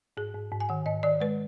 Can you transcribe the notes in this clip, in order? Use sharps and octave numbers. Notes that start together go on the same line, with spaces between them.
G#2 G#4
G#2
G#2
G#5
D#3 F#5
G#2 D#5
D#3 D5
G#3 B4